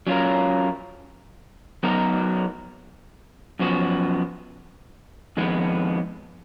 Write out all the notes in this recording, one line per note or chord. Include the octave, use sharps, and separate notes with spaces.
F#3 C#4 F4 A#4
F#3 B3 D#4 F#4 A#4
F#2 F3 B3 F#4
F2 D#3 G#3 B3